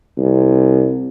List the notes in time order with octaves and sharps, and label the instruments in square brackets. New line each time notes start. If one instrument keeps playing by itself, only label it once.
[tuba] C2